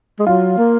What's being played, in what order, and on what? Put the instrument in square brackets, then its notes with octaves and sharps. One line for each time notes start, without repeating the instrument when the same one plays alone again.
[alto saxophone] G#3
[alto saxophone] F#3 [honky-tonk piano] F4
[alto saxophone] A#3